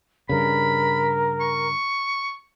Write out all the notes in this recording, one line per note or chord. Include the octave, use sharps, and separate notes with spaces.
G2 C#3 A#4 B5
C#6